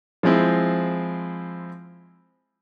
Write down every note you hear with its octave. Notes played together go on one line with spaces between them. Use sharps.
F3 G#3 C4 E4